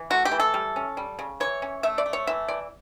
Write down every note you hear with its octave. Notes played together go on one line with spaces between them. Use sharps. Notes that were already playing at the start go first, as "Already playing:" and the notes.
Already playing: E3
A3 F#4
G4
E3
A4
G3
C#4
G3
C#3
E3 C#5
C#4
A3 E5
D5
A3
C#5
E3 E5
E3 D5